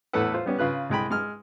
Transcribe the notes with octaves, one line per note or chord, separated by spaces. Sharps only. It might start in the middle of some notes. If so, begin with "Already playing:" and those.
E2 A2 A4 B4 F#5
F4 C5
G3 B3 C#4
C#3 F4 B4 F#6
C2 G#3 G5 B5
G#3 F6